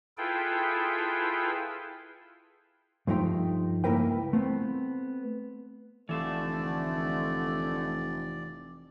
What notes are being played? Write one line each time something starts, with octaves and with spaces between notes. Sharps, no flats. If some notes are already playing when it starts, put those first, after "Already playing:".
E4 F4 G#4 A4 B4 G5
G2 F3 A3 D#4 G5 C6
C#2 A#3 E4 A#4 B4 G5
A3 B3 C4
F1 D3 E3 A3 D5 E5 F5